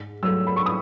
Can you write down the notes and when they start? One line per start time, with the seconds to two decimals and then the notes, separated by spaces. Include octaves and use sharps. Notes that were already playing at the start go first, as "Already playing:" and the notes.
Already playing: G#2
0.22 F#3 A3 E6
0.47 B5
0.56 C#6
0.66 D#6